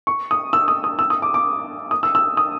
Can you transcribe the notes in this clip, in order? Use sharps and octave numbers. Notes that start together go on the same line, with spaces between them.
C#6
D#6
E6
D#6
D#6
E6
D#6
D6
D6
D#6
E6
E6
D#6